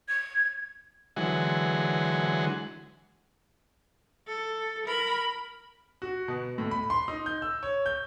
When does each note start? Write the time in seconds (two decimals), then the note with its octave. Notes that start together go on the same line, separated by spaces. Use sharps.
0.08 G#6
1.16 D3 E3 F#3 G#3 F#5 G#5
4.27 A4
4.86 A#4 B5
6.02 F#4
6.28 B2
6.58 A2
6.71 B5
6.90 C6
7.08 D#4
7.26 G6
7.42 E6
7.63 C#5
7.86 G6